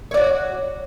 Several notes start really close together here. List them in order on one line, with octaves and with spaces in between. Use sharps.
C#5 D5 F#4